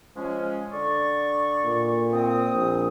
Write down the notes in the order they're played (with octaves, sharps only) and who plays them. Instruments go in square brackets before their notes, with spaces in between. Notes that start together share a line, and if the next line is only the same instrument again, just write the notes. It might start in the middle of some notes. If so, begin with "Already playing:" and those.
[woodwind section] F3 G#3 C#4
D3 D5 C#6
[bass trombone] A#2
[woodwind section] C4 D#6
[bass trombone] A#1